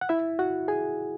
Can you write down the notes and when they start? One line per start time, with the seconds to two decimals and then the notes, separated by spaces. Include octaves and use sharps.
0.01 F#5
0.09 E4 E5
0.39 F#4 F#5
0.68 G#4 G#5